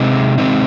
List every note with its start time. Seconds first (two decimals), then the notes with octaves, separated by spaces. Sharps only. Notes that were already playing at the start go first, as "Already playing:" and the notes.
Already playing: C3 G#3 C4 D#4
0.38 C3 G#3 C4 D#4